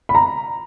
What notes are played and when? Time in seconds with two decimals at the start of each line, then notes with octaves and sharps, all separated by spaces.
0.09 B5
0.15 A#5